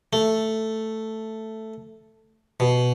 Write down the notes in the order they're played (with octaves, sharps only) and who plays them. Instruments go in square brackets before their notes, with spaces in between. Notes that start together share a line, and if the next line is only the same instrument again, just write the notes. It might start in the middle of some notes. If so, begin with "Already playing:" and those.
[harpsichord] A3
B2